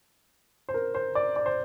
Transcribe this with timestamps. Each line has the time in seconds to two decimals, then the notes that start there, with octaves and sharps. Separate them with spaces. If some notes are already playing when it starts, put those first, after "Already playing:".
0.69 C5
0.74 A#4
0.95 C5
1.15 D5
1.36 D5
1.46 C5